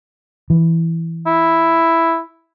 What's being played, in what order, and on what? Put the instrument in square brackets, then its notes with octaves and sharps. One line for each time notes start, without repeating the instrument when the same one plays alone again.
[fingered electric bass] E3
[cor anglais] E4